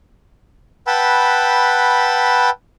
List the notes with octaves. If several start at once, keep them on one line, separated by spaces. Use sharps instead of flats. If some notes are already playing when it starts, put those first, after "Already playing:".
B4 F#5 G5 A5 B5 E6